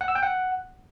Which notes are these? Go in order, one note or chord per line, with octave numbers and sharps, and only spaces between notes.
F#5
E6
G5
F#5